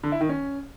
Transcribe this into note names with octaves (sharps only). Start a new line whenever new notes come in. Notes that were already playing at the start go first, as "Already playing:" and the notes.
D3
E4
D#3
C#4